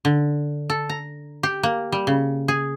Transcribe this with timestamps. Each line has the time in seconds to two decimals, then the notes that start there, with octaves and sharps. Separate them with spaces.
0.05 D3
0.70 A4
0.89 A#5
1.43 G4
1.63 A#3
1.92 G3
2.07 C#3
2.48 G#4